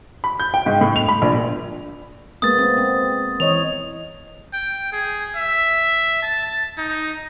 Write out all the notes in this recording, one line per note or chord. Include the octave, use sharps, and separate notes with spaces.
B5
G6
G5
G#2
A2
F7
B5
A#1
A#2
G#3 A#3 B3 D#6 A6
B3 C4
C4
E3 C#5 D#5 F7
G5
G#4
E5
A5
D#4